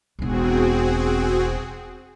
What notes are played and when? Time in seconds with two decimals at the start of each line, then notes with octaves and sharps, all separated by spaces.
0.19 E1 E2 C4 F#4 G#4